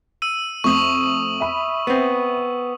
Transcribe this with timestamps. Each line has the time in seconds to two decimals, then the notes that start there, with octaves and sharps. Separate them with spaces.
0.22 E6 D#7
0.64 F2 A3 C#6 D#6 F#7
1.40 E5 B5
1.87 B3 C4